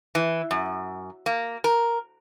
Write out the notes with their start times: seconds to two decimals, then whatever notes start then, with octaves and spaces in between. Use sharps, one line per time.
0.15 E3
0.51 F#2
1.26 A#3
1.64 A#4